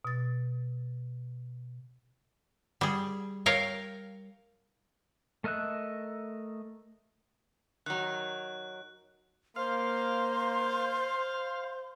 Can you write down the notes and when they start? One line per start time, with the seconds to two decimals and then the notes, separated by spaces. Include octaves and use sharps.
0.05 B2 A6
2.81 G3 G#4
3.46 A#4 C#5 F5 G5
5.44 A3 A#4 D#5 E5 F#6
7.86 D#3 F#3 F#6
9.56 A#3 C5 F5 C6